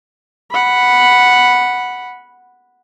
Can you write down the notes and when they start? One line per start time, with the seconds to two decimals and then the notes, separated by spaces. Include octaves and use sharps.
0.51 F#5 B5